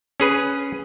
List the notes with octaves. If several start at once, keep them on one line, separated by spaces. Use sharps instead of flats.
C#4 G#4 B4